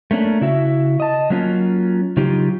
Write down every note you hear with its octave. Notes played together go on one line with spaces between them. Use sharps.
A3 A#3 C#4 D4
C#3 E4 F#4 E5
D#5 A5
F#3 A#3 C#4 F4
C#3 F#3 D#4 F4 G4